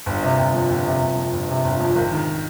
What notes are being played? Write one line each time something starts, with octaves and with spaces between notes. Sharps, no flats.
G1
C3
G1
F2
G1
C3
G1
F2
G1
C3
G1
F2
G#1
D#3